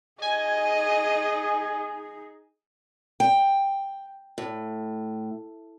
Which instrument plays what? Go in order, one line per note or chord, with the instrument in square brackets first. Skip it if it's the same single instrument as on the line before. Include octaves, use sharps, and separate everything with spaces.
[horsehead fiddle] D#4 G#4 [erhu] D#5 [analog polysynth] G#5
[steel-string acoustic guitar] G5
A2